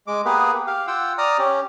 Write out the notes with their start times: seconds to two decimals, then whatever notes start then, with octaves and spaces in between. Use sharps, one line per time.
0.07 G#3 D6
0.25 A#3 B3 G4 G#4 B4
0.67 G4 F5
0.87 F4 F#5 G5 E6
1.18 D5 A#5 D#6 F6
1.38 C#4 G4